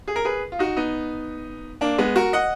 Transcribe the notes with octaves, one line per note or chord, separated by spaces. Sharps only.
G#4
A#4
G#4 B4
F4
D#4 F#4
B3 D#4
A#3 D4
G#3 B3
F#4 A#4
D#5 F#5